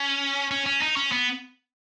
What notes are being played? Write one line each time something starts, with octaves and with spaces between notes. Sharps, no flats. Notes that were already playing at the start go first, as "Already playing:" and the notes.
Already playing: C#4
C#4
C#4
D#4
C#4
B3